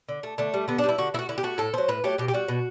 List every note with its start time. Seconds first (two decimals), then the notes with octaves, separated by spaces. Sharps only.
0.09 D3
0.23 A3
0.38 D3 A3
0.54 G3
0.68 D3 B3
0.78 D4
0.84 G3
0.89 E4
0.98 D3 F#4
1.14 A3 E4
1.19 F#4
1.29 D3 E4
1.38 G4
1.43 A3 F#4
1.58 A2 A4
1.74 F#3 A3 C5
1.88 A2 B4
2.04 F#3 A3 G4
2.18 B2 G4
2.28 G4
2.33 G3 F#4
2.48 B2